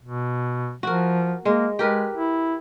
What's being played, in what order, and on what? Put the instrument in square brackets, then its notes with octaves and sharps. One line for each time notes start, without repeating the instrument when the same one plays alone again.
[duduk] B2
[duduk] F3 [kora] F#4 A#4
[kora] G#3 [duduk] A#3
[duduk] G#3 [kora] G4 A#4 B4
[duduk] E4